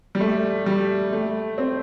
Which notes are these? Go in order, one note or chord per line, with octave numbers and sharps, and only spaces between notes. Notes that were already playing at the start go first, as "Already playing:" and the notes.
G3
A3
G3
A3
C4